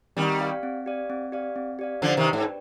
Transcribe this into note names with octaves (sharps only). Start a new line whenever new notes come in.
D#3 G3 C4
G4 D5 F5
C4
G4 D5 F5
C4
G4 D5 F5
C4
G4 D5 F5
D3 F3 D#4
C3 D#3
G4 B4 D5 G5
G#2